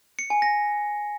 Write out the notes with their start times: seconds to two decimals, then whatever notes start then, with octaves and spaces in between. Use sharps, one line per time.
0.19 C#7
0.30 G#5
0.42 A#6